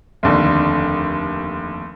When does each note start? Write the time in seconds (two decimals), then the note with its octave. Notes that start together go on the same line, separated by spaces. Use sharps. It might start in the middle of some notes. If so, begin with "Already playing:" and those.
0.23 F1 D#2 D3